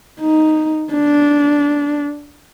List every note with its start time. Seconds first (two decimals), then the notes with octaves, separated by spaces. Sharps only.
0.20 D#4
0.93 D4